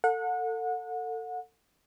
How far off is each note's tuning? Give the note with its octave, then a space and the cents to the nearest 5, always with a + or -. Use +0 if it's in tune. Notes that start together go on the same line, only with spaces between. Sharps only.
A4 +30 F#5 -30